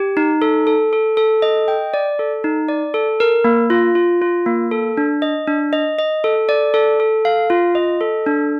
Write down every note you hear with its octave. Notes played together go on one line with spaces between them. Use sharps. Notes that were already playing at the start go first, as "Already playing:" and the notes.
Already playing: G4
D#4
A4
A4
A4
A4
D#5
G5
D5
A4
D#4
D5
A4
A#4
A#3
F4
F4
F4
A#3
A4
D4
D#5
D4
D#5
D#5
A4
D5
A4
A4
F5
F4
D#5
A4
D4